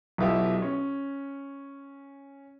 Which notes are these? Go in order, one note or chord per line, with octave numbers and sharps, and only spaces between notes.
B1 B2 E4 F4 G4
C#4